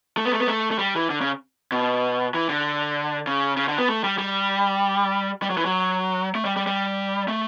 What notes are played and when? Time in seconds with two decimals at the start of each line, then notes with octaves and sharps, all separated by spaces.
0.17 A3
0.25 B3
0.32 A3
0.40 B3
0.48 A3
0.71 A3
0.79 G3
0.95 E3
1.10 D3
1.21 C#3
1.72 B2
2.34 E3
2.49 D3
3.27 C#3
3.57 C#3
3.68 D3
3.78 B3
3.88 A3
4.04 G3
4.18 G3
5.42 G3
5.50 F#3
5.57 E3
5.65 F#3
6.35 A3
6.45 G3
6.56 G3
6.67 G3
7.28 A3